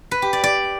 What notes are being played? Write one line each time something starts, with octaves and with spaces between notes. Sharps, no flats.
B4
G4
D5
D5